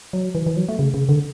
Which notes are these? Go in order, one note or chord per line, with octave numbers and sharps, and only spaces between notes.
F#3
E3
E3
F#3
A3
C#3
C#3
D3